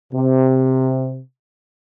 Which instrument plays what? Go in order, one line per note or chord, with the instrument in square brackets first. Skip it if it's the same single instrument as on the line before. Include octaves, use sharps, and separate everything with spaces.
[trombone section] C3